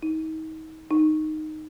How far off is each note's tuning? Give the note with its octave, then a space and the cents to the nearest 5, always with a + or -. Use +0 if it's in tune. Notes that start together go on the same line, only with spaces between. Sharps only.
D#4 +35
D#4 -5